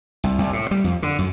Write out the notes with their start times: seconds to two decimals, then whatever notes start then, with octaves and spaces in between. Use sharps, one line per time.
0.24 C2
0.39 C2
0.53 A2
0.71 G3
0.84 F2
1.03 D3
1.19 F#2